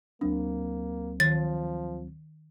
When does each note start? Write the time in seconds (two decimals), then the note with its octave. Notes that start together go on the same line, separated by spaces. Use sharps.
0.21 D2 F#3 A#3 C4 D4
1.20 D#3 F3 A6